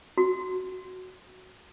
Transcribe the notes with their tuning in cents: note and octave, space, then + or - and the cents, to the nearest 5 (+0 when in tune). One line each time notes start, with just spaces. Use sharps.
F#4 -5